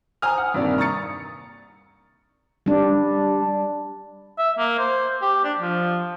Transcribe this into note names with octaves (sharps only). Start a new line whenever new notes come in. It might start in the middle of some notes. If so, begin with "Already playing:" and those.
C5 G#5 A#5 D#6 F6
F#5
G2 C3 D#3 A#3 D5
A#5 C#6 D#6 A6 C#7
G3 D4
E5
A#3
C5
G4
D4
F3